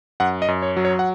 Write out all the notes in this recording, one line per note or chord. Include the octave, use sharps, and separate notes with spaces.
F#2 F#5
D#5
F#2
C#5
F#3
C#5
F#5